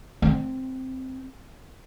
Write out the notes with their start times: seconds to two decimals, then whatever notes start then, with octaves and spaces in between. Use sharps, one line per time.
0.22 C4